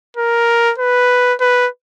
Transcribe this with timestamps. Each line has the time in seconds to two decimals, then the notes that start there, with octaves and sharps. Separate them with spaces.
0.17 A#4
0.78 B4
1.40 B4